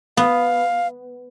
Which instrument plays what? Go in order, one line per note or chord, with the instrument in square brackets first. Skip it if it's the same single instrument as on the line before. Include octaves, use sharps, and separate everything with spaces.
[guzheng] B3 [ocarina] F5